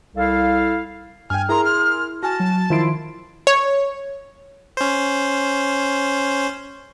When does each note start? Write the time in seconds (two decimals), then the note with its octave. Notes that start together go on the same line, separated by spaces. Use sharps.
0.15 C2 E4 A4 F5
1.30 G2 G5 G#5 F6
1.49 E4 G#4 A#4 A#5 C6
1.65 F6
2.23 F#4 G#5 A5 F6 A#6
2.40 F#3
2.70 D#3 F3 E4 C6 C7 D7
3.47 C#5
4.77 C#4 C5